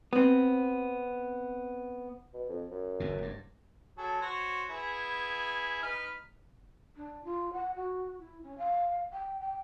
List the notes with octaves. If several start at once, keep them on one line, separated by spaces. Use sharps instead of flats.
B3 C4
B2
F2
F#2
G1 E2 B2
F#1 G2
F#3 G#4 A4
F#4 C5 C#5
B3 E4 G#4
D#4 B4 F6
D4
F4
F#5
F#4
E4
C#4
F5
G5
G5